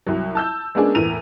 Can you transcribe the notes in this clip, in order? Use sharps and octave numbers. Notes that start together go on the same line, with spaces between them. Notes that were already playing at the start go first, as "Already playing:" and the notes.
C2 F#3
A5 E6 G6
G#3 A#3 B3 C#4 D4 G#4
E2 A2 A#4 D#7 F7